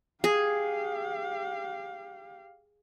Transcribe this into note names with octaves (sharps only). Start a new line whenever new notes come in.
G4 G#4 F5